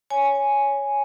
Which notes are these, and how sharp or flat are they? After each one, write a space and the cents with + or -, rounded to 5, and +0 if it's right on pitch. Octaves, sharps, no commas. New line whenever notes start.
C#5 +10 G#5 +0